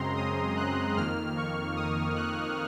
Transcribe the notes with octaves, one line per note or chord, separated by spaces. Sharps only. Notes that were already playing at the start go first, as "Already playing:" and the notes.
Already playing: F#2 C#3 G#3 C4 A#5 C6
D#6
F#6
F2 D#3 A#3 F6
C#6
D#6
F#6